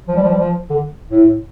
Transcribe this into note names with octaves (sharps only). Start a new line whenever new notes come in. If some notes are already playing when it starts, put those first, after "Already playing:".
F3
G3
F3
G3
F3
D3
A2